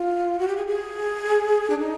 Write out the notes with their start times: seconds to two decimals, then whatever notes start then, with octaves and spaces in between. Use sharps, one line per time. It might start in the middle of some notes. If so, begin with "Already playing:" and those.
Already playing: F4
0.39 F#4
0.48 G4
0.57 G#4
0.67 G#4
1.70 D4
1.79 D#4